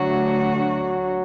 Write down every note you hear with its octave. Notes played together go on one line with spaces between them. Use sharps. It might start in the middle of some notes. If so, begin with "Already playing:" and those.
Already playing: D2 D3 F#3 A3 D4 F#4
F#3